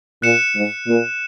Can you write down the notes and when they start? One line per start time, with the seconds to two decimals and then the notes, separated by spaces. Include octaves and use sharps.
0.22 A#2 F#6 C#7 E7
0.55 G#2
0.87 A#2